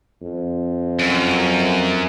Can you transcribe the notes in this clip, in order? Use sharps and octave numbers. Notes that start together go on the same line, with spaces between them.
F2
F#2